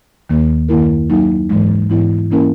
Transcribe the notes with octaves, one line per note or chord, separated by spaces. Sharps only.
D#2 D#3 A#3
F#2 D#3 A#3 E4 A#4
D#3 F#3 A#3 D#4
G#2 E3 G#3
G#2 E3 B3 E4
E3 A#3 C#4 E4 A#4